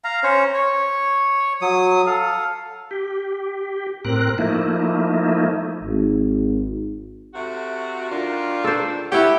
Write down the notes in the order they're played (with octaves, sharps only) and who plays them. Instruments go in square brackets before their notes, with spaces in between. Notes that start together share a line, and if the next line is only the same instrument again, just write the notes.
[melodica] F5 A#5
C#4 C5 C#5
C#5
F#3 D#6
A4 F5
[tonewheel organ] G4
A2 C4 A#4 F#6
F3 A3 A#3 D#4 E4
[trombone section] G#1
[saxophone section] C3 A3 F#4
[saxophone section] D#3 D4 [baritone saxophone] F4
[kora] A4 C5
[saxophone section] B3 D4 F#5 [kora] E4 C#5 [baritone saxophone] G4